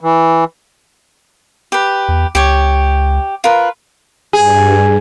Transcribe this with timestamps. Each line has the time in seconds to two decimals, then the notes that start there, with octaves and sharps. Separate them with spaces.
0.01 E3
1.72 G4 B4
2.08 E2
2.35 C#2 G4 C#5
3.44 F4 A#4 B4
4.33 G2 G#4